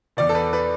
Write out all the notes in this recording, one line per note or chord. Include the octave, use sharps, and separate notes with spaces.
E2 B2 D5
A4
B4
B4